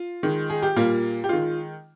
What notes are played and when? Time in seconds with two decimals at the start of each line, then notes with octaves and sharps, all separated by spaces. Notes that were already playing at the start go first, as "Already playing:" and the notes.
Already playing: F4
0.23 D#3 G#3
0.50 G#4
0.62 G4
0.76 A#2 G3 A#3 F4
1.24 G4
1.29 D#3 G#3 F4